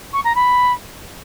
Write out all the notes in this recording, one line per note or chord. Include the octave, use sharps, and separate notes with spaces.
C#6
A#5
B5